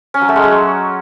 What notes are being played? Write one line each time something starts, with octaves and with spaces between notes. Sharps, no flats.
C#4
F#3
A3
G#3
F#3